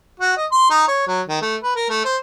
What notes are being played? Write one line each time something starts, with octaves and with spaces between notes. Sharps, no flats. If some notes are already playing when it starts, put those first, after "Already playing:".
F#4
D#5
C6
D#4
C#5
F#3
D#3
A3
B4
A#4
A3
C5